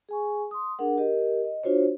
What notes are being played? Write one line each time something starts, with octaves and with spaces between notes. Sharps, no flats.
G#4 G#5 C#6
C6 D#6
D4 G#4 A#4 F#5
G4 A#4 D#5
D#5
D4 F4 F#4 C5 C#5